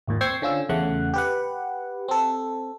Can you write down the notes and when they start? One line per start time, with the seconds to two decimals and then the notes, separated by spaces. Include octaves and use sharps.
0.07 G#1 D#2 A#2
0.21 C4 G5 C#6 E6 G#6 C7
0.42 D3 C#4 F4 E6
0.69 E2 C#3 A3 F#5 F#6
1.14 G4 B4 F#5
2.08 C4 A4